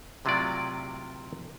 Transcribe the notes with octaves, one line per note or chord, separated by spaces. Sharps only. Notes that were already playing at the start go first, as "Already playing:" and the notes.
A2 C3 F#3 F4 B4 D5